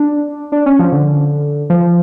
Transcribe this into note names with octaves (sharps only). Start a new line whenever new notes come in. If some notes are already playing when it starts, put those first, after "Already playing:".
Already playing: D4
D4
C#4
F3
D3
F3